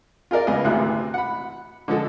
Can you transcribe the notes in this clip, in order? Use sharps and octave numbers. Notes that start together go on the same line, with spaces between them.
F4 G#4 A#4 D5
C#2 B3 G#4 D#5
G#1 D2 C3 E3 F#6
F#5 B5
D3 F3 G#3 A4